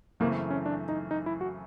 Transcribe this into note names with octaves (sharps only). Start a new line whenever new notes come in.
F#2 C#3 E3 A3 A#3 C4
C#4
D4
D#4
D#4
E4
F#4